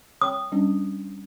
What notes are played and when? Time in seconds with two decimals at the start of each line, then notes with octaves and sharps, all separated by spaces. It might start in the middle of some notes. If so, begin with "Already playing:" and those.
0.21 C#5 G5 D#6
0.52 G3 C#4 D4